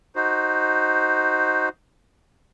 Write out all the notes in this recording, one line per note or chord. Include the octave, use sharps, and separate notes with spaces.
D#4 F#4 C5